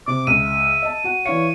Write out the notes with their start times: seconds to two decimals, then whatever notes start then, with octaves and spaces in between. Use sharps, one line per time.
0.08 C3 D6
0.27 C#2 E5 D#7
0.82 D#5 A5
1.04 F#4 F#5
1.26 E3 C#5 D5 F5 C#7